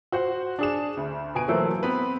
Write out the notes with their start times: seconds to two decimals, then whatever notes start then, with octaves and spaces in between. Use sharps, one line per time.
0.12 F#4 C5 F#5
0.59 D4 G#4 E7
0.97 D2
1.35 B2 G#5 D7
1.48 E3 F#3 A3 A#3 A4 C5
1.83 B3 C4 B4